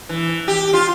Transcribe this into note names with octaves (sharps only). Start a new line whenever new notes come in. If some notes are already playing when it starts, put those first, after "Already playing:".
E3
G4
F4